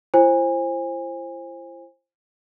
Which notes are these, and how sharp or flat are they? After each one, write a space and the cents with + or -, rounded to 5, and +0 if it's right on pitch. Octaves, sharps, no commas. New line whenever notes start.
E4 +45 C5 +20 G#5 -25